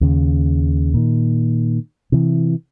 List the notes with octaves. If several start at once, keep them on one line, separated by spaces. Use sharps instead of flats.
D#2 C#3
A#2 D#3
C3 E3